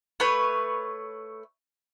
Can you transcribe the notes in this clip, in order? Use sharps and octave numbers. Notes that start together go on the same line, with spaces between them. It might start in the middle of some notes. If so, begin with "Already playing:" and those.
A3 B4 C#5